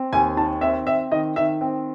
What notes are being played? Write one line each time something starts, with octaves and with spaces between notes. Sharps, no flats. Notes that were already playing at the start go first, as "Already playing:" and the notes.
Already playing: C4
D#2 G#5
D#3 A5
C4 E5
C4 E5
D#3 D#5
D#3 E5
C4